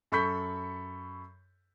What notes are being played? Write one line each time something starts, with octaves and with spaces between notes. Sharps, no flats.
F#2 A4 B5 C#6 G6 B6